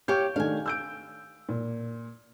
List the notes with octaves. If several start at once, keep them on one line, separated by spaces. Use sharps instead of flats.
G4 C#5 F5 G6
D#3 A3 D4 F5 G#5
E6 G6 D7
A#2